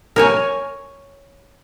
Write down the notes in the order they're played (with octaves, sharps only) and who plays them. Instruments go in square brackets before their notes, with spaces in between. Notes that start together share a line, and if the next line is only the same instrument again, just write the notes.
[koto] A#4 C#5 G#5